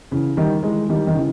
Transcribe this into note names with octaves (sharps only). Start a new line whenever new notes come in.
C#3 E3
D#3 G3
E3 G#3
D#3 G3
D#3
C#3 E3